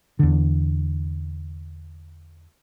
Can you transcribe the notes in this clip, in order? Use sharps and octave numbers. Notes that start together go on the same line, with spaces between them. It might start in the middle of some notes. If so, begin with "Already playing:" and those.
E2 D3